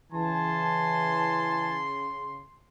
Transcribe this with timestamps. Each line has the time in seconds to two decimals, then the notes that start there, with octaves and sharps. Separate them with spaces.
0.13 C#3 E3 G#5 A5 C6